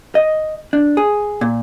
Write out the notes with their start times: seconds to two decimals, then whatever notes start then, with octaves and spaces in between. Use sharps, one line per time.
0.15 D#5
0.73 D4
0.97 G#4
1.41 A#2